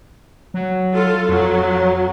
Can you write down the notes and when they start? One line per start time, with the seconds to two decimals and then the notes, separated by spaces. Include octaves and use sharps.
0.54 F#3
0.95 F4 A4
1.29 F2 F#3